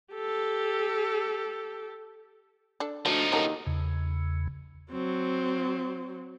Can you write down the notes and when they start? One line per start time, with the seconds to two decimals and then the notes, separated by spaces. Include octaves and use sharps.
0.14 G4 A4
2.80 D4 A4
3.06 D2 F3 D4 D#4
3.32 D#2 D3 C#4 A#4
3.67 E2 C#3
4.91 F#3 C4